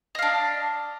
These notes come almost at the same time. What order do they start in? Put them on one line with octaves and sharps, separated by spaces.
D#5 F5 D4